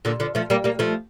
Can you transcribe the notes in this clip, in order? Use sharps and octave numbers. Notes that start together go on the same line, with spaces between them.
A#2 D3
D3 F3
F3 A3
G3 A#3
G3 A#3
F3 A3